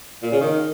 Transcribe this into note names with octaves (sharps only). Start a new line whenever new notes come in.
A#2
C#3
D#3